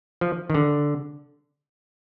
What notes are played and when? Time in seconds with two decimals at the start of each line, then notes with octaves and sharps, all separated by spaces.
0.21 F3
0.50 D#3
0.54 D3